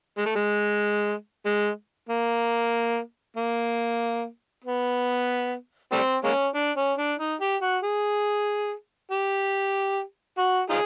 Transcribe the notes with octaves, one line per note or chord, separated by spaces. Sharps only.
G#3
A3
G#3
G#3
A#3
A#3
B3
G3 A3 C4
G#3 A#3 C#4
D4
C#4
D4
D#4
G4
F#4
G#4
G4
F#4
D#4 F4 G#4